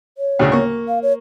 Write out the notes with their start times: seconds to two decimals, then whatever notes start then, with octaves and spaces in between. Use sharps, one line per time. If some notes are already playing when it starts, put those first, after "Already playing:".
0.18 C#5
0.39 D2 A2 C#3
0.52 A#3 C#6
0.88 F5
1.02 C#5